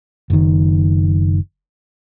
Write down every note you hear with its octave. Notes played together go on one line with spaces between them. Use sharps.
F#1 D#3